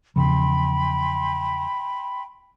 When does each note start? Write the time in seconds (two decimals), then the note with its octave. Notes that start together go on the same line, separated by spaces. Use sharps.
0.16 E2 C#3 F3 G5 B5 C6